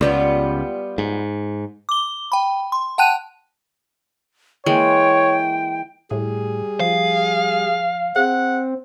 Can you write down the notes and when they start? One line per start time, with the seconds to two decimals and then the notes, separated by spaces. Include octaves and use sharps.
0.01 C#2 G3 B3 F4
0.98 G#2
1.89 D6 G7
2.32 G5 B5
2.72 C6
2.98 F#5 G5 A5 F#6 D#7
4.66 E3 G#3 A#3 C#5 G5
6.11 A2 G3 G#4
6.80 F3 F5
8.16 C4 G#4 F#5